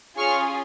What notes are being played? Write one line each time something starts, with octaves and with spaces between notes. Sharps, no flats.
C#4 F4 G#4 C#6 F6